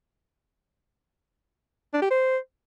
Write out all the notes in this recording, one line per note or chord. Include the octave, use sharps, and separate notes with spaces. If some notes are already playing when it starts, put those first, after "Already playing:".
D4
G4
C5